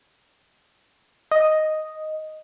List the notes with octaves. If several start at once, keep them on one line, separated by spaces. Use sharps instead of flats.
D#5